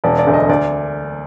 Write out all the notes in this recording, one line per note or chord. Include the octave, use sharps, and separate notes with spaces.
E1 D5
D5
D2 D3
D#5
D2 D5